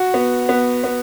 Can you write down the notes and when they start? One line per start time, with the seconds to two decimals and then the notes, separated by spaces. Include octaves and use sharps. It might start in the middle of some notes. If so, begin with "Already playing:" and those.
Already playing: F#4
0.14 B3
0.49 B3
0.84 B3